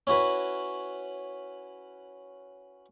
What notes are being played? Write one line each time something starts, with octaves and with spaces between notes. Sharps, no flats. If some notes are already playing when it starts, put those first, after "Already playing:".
C#4 E4 F#4 B4